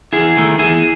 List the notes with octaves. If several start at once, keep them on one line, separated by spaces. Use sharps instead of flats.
E2 E4 G#4
D#3 A3
E2 E4 G#4